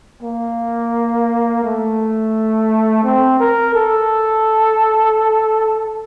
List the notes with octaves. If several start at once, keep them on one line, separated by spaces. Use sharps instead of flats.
A#3
A3
C4
A#4
A4